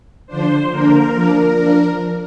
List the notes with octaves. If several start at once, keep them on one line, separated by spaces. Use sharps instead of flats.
D3 F3 D4 C5
D3 A#3 D4 A#4
F3 A#3 D4
F3 D4